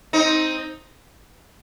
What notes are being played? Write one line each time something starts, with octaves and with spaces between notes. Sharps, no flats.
C4 D#4